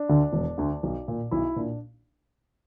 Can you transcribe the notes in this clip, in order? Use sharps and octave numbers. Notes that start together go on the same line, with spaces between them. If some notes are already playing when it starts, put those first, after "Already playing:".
Already playing: D4
D2 D3
E1
D2 D3
B1
A#2
B1 E4
A#2 D4